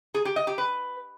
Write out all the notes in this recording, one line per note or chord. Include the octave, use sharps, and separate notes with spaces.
G#4
G4
D#5
G4
B4